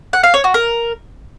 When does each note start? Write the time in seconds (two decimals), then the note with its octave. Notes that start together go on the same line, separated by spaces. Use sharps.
0.13 F#5
0.23 F5
0.34 C#5
0.44 F#4
0.54 A#4